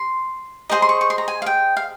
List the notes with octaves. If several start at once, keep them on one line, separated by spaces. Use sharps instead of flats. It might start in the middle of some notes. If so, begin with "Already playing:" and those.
Already playing: C6
G#4 C5 D#5 A#5
C6
C#6
C#6
C6
A#5
G#5
F5
G5
F5